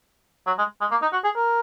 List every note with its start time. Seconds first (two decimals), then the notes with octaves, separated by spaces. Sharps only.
0.47 F#3
0.58 G#3
0.81 G#3
0.91 A#3
1.02 D#4
1.13 F#4
1.24 G#4
1.36 A#4